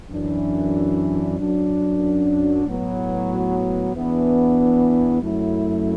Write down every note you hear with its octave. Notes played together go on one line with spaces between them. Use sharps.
F#2 E3 D4
F#2 F#3 D4
A2 F#3 B3
E2 E3 B3 D4
F#2 F#3 A3 E4